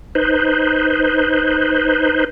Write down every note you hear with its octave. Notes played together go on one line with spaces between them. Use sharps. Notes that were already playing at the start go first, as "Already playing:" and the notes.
D#4 B4 C5